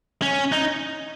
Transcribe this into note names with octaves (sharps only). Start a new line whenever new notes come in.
C#4
D#4